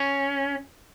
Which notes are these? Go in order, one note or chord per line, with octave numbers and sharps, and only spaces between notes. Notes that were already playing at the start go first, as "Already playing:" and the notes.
Already playing: C#4